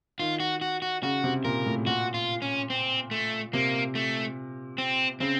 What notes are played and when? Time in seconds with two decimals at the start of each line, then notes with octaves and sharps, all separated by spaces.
0.20 D#3 F4
0.40 F#4
0.61 F#4
0.82 F#4
1.03 C#3 F#4
1.24 C3
1.44 A#2 A#4
1.66 A2
1.87 A#2 F#4
2.14 F4
2.42 C#4
2.70 C4
3.11 A3
3.53 C3 A#3
3.95 A3
4.78 C4
5.20 C#3 C4